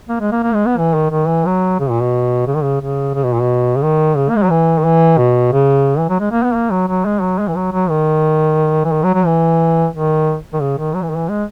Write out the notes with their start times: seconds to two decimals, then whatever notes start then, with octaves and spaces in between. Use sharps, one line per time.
0.09 A#3
0.20 G#3
0.31 A#3
0.43 A#3
0.54 G#3
0.66 B3
0.77 E3
0.94 D#3
1.10 D#3
1.27 E3
1.45 F#3
1.79 C#3
1.90 A#2
2.02 B2
2.47 C#3
2.55 D#3
2.63 C#3
2.81 C#3
3.14 C#3
3.24 B2
3.33 A#2
3.41 B2
3.76 C#3
3.83 D#3
4.16 C#3
4.29 A#3
4.36 G#3
4.43 F#3
4.50 E3
4.78 D#3
4.85 E3
5.18 B2
5.53 C#3
5.98 E3
6.09 F#3
6.20 G#3
6.31 A#3
6.43 B3
6.54 A#3
6.70 F#3
6.88 F#3
7.05 G#3
7.21 F#3
7.39 G#3
7.48 E3
7.56 F#3
7.72 F#3
7.89 D#3
8.85 E3
8.92 D#3
9.03 F#3
9.14 F#3
9.25 E3
9.93 D#3
10.53 D#3
10.60 C#3
10.78 D#3
10.95 F#3
11.02 E3
11.09 D#3
11.16 E3
11.29 G#3